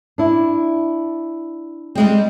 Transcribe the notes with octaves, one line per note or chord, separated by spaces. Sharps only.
D4 E4
G3 G#3 C4